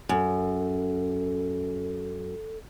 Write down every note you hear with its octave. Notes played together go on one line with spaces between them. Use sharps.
F#2 A4